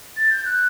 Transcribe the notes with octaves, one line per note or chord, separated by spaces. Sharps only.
A6
G6
F#6